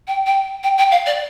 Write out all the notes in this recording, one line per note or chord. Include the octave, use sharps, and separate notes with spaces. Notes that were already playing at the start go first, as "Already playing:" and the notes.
G5
G5
G5
G5
F5
D5